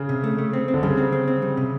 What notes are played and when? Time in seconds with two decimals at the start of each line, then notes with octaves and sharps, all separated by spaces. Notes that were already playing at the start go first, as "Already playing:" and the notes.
Already playing: C#3
0.09 C3
0.24 A3
0.39 A3
0.53 C4
0.68 C4
0.74 D3
0.83 C#3 G3
0.97 C4
1.12 C4
1.28 C4
1.42 G3
1.57 C3